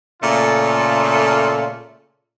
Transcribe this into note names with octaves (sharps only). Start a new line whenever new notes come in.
A#2 C#3 A3 F4 A4